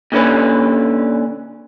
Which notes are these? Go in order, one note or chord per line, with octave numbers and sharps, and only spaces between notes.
A#2 D3 C#4 B4